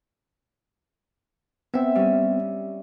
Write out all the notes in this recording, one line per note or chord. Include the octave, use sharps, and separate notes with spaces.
B3 C4 E5
G3 C#4